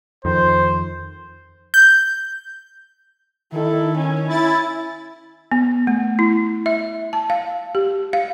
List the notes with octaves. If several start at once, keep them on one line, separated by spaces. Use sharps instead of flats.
F2 D#3 C5
G6
D#3 E4 A4
C#4 G#5
E4 A6
B3
A3
E4
E5
A5
F5
G4
F5